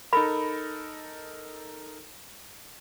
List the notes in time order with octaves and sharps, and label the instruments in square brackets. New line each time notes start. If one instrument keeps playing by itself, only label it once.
[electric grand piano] D#4 A4 A#4 [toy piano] B5